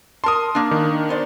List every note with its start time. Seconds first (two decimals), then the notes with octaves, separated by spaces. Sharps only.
0.24 A#4 A5 C6 D#6
0.55 A#3 D4
0.71 D#3
1.09 B3 C5 D5